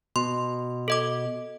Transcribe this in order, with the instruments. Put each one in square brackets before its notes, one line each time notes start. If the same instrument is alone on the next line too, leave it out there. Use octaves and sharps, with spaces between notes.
[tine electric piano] B2 [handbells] C6
[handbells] A4 D#5 D6